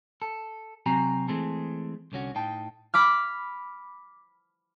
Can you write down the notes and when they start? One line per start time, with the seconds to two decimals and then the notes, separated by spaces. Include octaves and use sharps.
0.22 A4
0.86 C3 F#3 C4 F#4 G#5 A#5
1.28 E3 G#3 A3 C4 G#4 A4
2.12 C2 D3 C#4 F#4
2.35 A2 D#4 G5 A5
2.94 B5 D6 F6